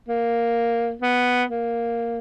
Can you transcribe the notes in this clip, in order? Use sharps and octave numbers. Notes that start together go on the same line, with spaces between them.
A#3
B3
A#3